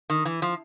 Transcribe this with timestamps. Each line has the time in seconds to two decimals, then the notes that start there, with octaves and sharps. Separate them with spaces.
0.10 D#3
0.25 E3
0.42 F3